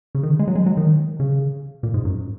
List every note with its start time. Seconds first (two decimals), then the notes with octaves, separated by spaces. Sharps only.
0.15 C#3
0.23 D#3
0.39 G#3
0.48 F#3
0.55 G#3
0.66 F#3
0.77 D#3
1.20 C#3
1.83 A#2
1.94 G#2
2.05 F#2